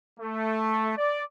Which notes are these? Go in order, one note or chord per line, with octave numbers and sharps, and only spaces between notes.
A3
D5